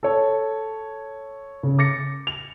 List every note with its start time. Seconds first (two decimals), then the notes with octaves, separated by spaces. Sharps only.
0.03 A4 C#5
1.63 C#3
1.78 D6 A6 A#6 C#7
2.27 F7